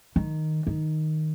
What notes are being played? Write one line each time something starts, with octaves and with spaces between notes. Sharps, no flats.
D#3
D#3